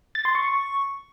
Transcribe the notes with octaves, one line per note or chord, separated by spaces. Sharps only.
A6
C6
C#6